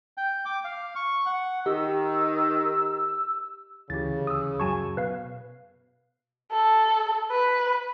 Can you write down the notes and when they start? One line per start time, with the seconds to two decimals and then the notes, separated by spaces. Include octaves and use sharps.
0.18 G5
0.45 D6
0.65 F5
0.96 C#6
1.26 F#5
1.66 D#3 G4 E6
3.90 D2 C#3 E3 G4 A6
4.27 D#6 E6
4.60 F#2 F#3 G#5 A5 C#6 G#6
4.97 B2 B4 F5
6.52 A4
7.31 B4